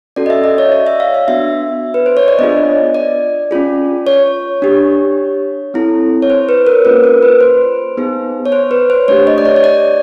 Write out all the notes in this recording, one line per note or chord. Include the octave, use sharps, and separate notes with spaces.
C#4 F#4 A4 D5
D#5
E5
D#5
C#5
D5
E5
F5
E5
B3 D4 F#4 E5
B4
C5
C#5
D5
B3 D4 F4 G#4 D#5
D5
C#4 F4 G#4
C#5
D4 G4
C4 E4 A4
C#5
C5
B4
A#4
A#3 C#4 F4 B4
A#4
B4
C5
B3 D#4 G#4
C#5
C5
B4
C5
A3 D4 G4 C#5
D#5
D5
C#5
C#5
D5